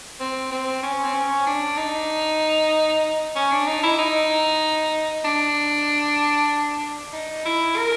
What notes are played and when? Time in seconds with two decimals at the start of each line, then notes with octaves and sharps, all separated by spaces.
0.20 C4
0.51 C4
0.83 C#4
1.04 C4
1.14 C#4
1.46 D4
1.77 D#4
3.36 C#4
3.51 D4
3.67 D#4
3.83 E4
3.98 D#4
5.25 D4
7.13 D#4
7.45 E4
7.77 A#4